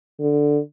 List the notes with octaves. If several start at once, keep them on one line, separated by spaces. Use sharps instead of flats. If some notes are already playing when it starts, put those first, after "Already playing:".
D3